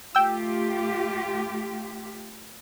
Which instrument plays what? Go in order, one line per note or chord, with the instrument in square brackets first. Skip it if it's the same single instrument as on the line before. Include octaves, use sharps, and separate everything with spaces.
[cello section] A3 F4 G4 [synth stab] G5 E6